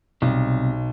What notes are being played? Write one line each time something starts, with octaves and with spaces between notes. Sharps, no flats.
B1 C3 G3